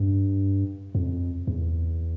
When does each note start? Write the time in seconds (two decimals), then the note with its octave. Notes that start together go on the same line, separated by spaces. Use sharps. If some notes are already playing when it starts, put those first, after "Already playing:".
Already playing: G2
0.95 F2
1.47 E2